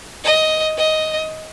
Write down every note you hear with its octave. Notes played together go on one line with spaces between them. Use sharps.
D#5
D#5